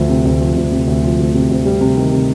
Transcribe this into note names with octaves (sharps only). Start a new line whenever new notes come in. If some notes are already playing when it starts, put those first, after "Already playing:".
Already playing: D2 F3
C3
D2
F3
D2
C3
D2
F3
D2
C3
D2
G3
C3
D#3
C3